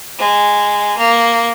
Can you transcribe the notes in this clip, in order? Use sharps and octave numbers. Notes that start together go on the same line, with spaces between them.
G#3
A#3